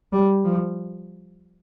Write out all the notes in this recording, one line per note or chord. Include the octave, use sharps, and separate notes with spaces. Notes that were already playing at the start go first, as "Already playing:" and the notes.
G3
F3